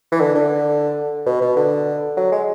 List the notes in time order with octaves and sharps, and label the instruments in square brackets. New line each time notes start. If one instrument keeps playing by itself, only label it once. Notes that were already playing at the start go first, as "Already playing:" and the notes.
[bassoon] E3
D3
D3
B2
B2
D3
F#3
G#3